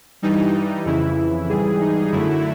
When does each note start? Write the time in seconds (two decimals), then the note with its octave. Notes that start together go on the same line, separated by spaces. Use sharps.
0.22 G2 E3 G3 D#4
0.85 F2 C#3 E3 E4
1.49 G#2 E3 G3 G#4
1.81 D#4
2.12 F#2 D3 F#3 A3 E4